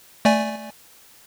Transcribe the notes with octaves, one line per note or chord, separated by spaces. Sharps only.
A3 D5 G#5